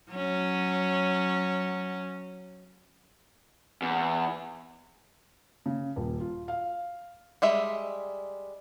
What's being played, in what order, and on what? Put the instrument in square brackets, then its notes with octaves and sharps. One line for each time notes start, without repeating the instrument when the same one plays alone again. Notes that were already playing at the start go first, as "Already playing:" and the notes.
[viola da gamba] F#3 C#4
[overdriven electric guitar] E2
[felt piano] C#3
D#1
F4
F5
[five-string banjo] G3 G#3 E5